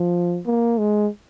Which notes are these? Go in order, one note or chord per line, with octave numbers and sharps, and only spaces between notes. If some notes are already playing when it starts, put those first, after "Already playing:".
Already playing: F3
A#3
G#3